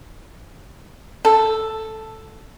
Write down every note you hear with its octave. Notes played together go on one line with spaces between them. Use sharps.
A4